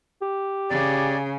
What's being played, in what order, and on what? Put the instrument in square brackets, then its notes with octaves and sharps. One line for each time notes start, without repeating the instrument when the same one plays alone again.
[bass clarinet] G4
[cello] C#3 [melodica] D5